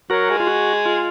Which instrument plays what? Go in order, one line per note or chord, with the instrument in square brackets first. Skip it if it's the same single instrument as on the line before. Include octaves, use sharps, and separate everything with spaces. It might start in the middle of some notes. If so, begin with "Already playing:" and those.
[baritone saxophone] F#3 [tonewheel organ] F#4 A#4
[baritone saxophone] G#3
[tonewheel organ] F4
F#4
F4